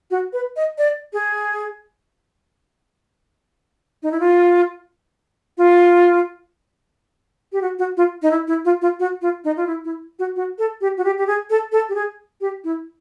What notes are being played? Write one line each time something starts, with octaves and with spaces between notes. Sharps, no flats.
F#4
B4
D#5
D5
G#4
D#4
E4
F4
F4
G4
F#4
F#4
F4
D#4
E4
E4
F4
F4
F#4
F4
D#4
F4
E4
E4
F#4
F#4
A4
G4
F#4
G4
G4
G#4
A4
A4
G4
G#4
G4
E4